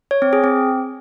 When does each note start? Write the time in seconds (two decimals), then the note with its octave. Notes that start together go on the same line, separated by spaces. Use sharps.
0.11 C#5
0.22 C4
0.33 G#4
0.44 C4